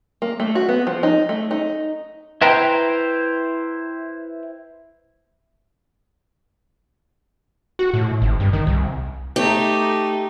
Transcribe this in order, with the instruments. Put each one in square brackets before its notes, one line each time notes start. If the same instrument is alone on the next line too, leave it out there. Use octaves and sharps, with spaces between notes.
[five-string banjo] A#3
A3
F#4
B3
F3
D#4
A3
D#4
[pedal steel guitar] E4 B4 C5 G5 A#5
[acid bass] F#4
A2
G#1
G2
D#3
C2
[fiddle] A3 D#4 [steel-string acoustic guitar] G4